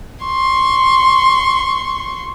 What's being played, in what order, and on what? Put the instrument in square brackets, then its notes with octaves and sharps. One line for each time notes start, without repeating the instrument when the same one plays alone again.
[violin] C6 C#6